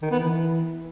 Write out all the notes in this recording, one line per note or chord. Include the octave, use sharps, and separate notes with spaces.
D#3
B3
E3